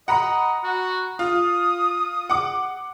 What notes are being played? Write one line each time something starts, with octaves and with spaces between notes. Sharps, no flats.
D#5 F#5 A#5 B5
F#4
F4 D#6
F#5 D6